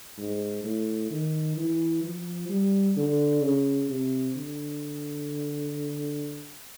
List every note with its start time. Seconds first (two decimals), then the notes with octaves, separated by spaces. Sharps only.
0.18 G#2
0.64 A2
1.11 D#3
1.57 E3
2.03 F3
2.49 G3
2.97 D3
3.42 C#3
3.89 C3
4.36 D3